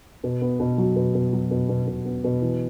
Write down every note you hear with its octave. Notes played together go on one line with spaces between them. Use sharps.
B2
B3
B2
F#3
B2
B2
F#3
B2
B2
B2
B3
B2
E3